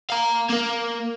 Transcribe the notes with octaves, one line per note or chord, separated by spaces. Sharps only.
F5 A#5
A#3 A#4